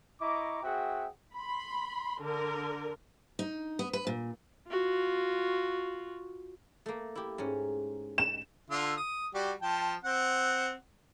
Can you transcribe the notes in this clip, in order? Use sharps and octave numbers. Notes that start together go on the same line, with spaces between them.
E4 D#5 A#5 C#6 D6
C4 F#4 G#4 E5 F#5 G5
B5 C6
D3 A#4
D#4
B3
B4
A#2
F4 F#4
A3 A#3
E4 G4
G#2 C#4
E7
D3 F4 E6
D#6
G3 F#4 G4
F3 G5 A5
C4 F#5